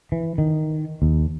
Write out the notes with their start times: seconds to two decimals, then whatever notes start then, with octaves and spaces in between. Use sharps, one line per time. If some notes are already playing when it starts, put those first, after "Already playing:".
0.12 E3
0.38 D#3
1.02 D#2